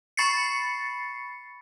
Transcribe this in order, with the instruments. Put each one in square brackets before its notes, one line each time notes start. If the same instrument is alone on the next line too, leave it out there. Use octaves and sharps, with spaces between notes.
[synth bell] B5 C#6 A6 C7 C#7